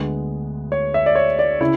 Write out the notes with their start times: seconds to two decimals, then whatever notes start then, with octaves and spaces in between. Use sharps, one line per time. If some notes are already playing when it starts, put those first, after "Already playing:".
Already playing: D2 D3 G#3 B3
0.72 C#5
0.94 E5
1.06 D5
1.15 C#5
1.39 D5
1.61 C#3 E4